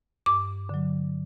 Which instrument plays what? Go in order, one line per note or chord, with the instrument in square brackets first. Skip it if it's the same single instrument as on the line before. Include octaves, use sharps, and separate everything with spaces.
[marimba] G2 D6
D3 F#3